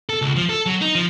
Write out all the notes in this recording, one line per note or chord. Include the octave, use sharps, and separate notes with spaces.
A4
C#2
F3
A4
F#3
D#4
F3